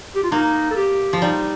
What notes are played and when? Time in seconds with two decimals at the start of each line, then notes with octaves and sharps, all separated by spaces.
0.15 G4
0.24 F4
0.31 A#3 D#4
0.71 A4
0.77 G4
1.13 F3
1.18 F4
1.22 G3 D#4